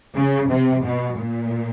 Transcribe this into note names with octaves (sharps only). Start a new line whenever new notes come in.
C#3
C3
B2
A#2